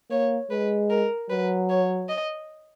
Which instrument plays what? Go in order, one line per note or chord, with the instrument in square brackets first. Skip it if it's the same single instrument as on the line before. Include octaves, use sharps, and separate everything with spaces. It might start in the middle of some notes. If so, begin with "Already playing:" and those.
[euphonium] A#3 [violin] C#5
[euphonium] G#3 [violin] B4
[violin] A#4
[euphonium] F#3 [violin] B4
[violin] C#5
D#5